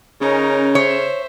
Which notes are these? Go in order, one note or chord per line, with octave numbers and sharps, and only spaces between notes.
C#3 C#4 D#4 A#4
C5 C#5 E5